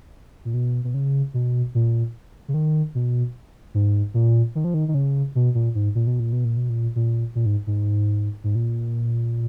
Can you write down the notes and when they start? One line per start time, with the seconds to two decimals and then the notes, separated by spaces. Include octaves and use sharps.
0.45 A#2
0.54 B2
0.84 B2
0.94 C#3
1.34 B2
1.75 A#2
2.48 C#3
2.54 D#3
2.95 B2
3.74 G#2
4.14 A#2
4.55 D#3
4.64 F3
4.74 D#3
4.88 D#3
4.94 C#3
5.35 B2
5.55 A#2
5.75 G#2
5.95 A#2
6.07 B2
6.20 A#2
6.32 B2
6.45 A#2
6.57 B2
6.69 A#2
6.96 A#2
7.35 A#2
7.46 G#2
7.67 G#2
8.44 G#2
8.55 A#2